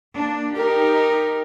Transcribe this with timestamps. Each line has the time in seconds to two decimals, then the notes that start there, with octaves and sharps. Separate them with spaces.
0.15 A#3 D4
0.57 D#4 G4 A#4